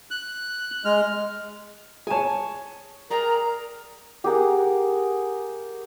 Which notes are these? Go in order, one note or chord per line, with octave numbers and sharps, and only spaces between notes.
F#6
G#3 F6
G#4 C#5 G#5 A5
G#4 A#4 D5 G5 A#5
G4 G#4 A#4 F#5